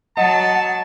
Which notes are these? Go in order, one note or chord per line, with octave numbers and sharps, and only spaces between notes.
F#3 D#5 F#5 A5